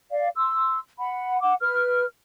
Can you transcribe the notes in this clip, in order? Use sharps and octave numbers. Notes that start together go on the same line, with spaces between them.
D5 F5
C6 E6
F#5 B5
F#5 D6
B4 F6